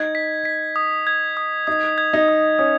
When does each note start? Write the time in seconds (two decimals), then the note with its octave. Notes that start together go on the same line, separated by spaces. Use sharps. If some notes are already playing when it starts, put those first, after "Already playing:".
Already playing: D#4 G#6
0.15 B6
0.45 B6
0.76 D#6
1.07 G#6
1.37 D#6
1.67 D#4 D#6
1.98 G#6
2.13 D#4
2.28 D#6
2.59 C#4 D#6